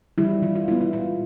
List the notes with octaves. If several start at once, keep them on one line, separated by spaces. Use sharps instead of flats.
E3 G3 E4
E3 F4
F4
G#3 B3 E4
E4
A#2 F4